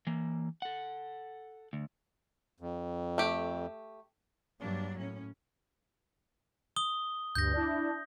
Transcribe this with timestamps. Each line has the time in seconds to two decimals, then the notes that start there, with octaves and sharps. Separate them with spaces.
0.07 E3 A#3
0.62 A4 F#5
1.73 D2
2.60 F2
3.18 A3 G4
4.60 G2 F#3 A#3 D4
4.97 A2 C#4
6.76 D#6 G7
7.35 D2 G2 G6 A#6
7.53 D4 E4